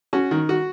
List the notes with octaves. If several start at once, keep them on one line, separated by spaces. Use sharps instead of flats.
C#4 F#4
D#3
F#4